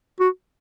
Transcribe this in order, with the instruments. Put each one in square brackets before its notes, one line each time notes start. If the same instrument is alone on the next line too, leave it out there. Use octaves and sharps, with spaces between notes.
[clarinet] F#4